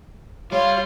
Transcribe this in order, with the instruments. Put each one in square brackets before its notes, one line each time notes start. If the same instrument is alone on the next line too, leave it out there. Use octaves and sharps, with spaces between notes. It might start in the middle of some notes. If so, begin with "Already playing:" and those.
[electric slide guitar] G3 [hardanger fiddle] F4 [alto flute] C#5 [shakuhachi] F5